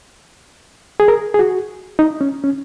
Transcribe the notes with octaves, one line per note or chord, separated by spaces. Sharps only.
G#4
A#4
G#4
F#4
D#4
C#4
C#4